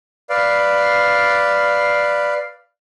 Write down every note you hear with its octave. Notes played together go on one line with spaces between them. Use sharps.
B4 D5 F5